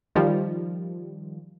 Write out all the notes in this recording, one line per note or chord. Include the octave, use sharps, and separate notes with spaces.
D#3 F3 G3